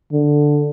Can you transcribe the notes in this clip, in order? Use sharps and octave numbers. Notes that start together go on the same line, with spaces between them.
D3